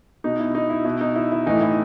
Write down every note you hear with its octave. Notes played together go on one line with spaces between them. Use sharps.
B2 D#4
E4
D#4
E4
B2 E4
D#4
E4
E4
A2 E3 D#4
E4